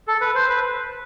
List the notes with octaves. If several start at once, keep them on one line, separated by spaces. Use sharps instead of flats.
A4
B4
C5
B4